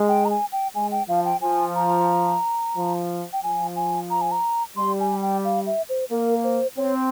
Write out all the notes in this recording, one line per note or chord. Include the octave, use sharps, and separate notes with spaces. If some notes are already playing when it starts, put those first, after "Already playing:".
Already playing: G#3
G5
A#5
G#5
G5
G#3 G#5
G5
F3 F5
G5
F3 G#5
A#5
F3
G5
F3 G#5
G#5
A#5
G#5
A#5
G3 C6
G#5
G5
F5
E5
C5
A#3 A#4
C5
C4 C#5